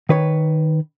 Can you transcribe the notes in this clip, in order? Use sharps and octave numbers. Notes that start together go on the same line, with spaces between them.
D#3 B4 C#5